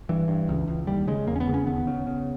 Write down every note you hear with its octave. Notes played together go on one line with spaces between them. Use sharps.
G2 E3
G2
C#2
C#2
D#2 G3
C#3 G#3
E2 A#3
C#4
B3
C#3
C#4
D#2 B3
C#3
C#3